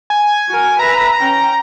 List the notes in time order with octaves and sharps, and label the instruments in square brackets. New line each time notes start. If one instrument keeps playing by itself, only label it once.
[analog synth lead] G#5
[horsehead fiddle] F#4 A#4
[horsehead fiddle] B4 E5 [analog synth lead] A#5
[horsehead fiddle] C#4 G5